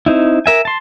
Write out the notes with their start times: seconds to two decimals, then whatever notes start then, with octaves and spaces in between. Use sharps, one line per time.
0.06 C4 D#4 E4
0.46 A#4 E5 G#5
0.65 A5 C6